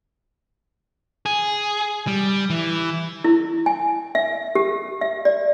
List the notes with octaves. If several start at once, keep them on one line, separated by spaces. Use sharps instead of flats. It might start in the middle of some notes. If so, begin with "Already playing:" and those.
G#4
G3
E3
E4
G#5
E5
G4
E5
D5